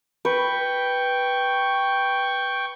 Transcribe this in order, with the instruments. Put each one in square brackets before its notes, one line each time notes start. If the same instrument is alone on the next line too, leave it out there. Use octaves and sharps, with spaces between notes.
[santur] B4 [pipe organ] G5 C#6